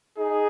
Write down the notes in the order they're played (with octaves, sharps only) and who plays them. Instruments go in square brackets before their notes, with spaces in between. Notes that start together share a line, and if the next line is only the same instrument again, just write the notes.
[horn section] D#4 G#4